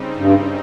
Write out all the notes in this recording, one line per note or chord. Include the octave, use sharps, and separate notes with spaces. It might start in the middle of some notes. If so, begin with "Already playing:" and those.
Already playing: C#3 G3 C4 D#4
G2